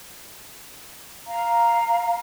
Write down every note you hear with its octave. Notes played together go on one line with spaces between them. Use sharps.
F5 A#5